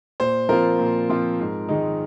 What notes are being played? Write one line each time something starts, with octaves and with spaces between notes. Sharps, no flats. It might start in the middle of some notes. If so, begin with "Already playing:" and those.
A#2 C5
F3 C4 F4 A#4
A#2
F3 C4 F4
G#2
D#3 G#3 D#4